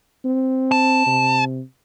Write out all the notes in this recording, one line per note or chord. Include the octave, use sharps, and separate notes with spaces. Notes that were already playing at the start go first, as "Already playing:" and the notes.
C4
A5
C3